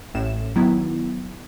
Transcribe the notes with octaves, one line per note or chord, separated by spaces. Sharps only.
A1 A2 E7
D#3 F#3 B3 E4